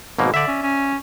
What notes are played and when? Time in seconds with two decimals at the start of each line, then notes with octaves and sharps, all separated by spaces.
0.18 G#1 B2 A#3
0.34 D3 D5 E5
0.47 C#4
0.62 C#4